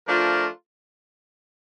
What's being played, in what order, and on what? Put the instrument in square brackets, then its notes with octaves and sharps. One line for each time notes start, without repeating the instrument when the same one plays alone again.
[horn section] F3 A3 D4 F4 A#4